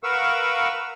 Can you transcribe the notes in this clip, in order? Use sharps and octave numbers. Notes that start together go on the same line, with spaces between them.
A#4 B4 F5 F#5 C#6 E6